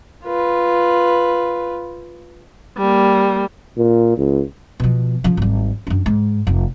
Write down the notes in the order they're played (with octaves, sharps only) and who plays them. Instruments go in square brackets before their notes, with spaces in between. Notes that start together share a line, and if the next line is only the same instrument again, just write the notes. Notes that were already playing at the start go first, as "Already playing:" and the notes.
[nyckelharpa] F4 B4
[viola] G3 A#3
[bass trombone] A#2
C#2
[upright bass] B2 F3
C#3 F3
G#1 G3
F#2 D4
G#2
F1